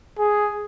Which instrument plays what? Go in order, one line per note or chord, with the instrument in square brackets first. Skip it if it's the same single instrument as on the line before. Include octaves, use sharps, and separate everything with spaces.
[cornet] G#4